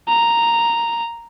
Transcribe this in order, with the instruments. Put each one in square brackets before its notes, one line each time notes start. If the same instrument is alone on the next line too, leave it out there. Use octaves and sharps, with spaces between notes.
[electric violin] A#5